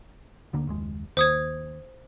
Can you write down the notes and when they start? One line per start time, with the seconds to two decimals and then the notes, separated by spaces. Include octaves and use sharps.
0.53 D2 D3 A#3
0.67 F#1 D#2 G#3
1.17 D#2 C5 D#6 G#6